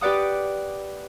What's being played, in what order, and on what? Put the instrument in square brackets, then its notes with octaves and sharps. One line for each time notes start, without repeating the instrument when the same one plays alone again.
[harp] G4 B4 D5 F#5 D#6